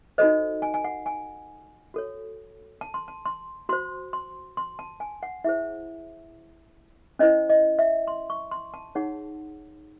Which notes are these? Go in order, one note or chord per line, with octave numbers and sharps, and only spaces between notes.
D#4 F#4 A4 C5 D#5
G#5
G#5
F#5
G#5
F#4 A4 C#5
A5
C6
A5
C6
F#4 C5 C6
C6
C6
A5
G#5
F#5
E4 G#4 C5 E5
C#4 E4 C5 D#5
D#5
E5
C6
C#6
C6
A5
D#4 G#4 C#5 F#5